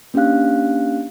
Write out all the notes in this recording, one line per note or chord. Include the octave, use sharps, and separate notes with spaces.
A#3 C#4 D4 G4 F5 F#6